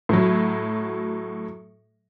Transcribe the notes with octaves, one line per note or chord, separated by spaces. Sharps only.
A2 F#3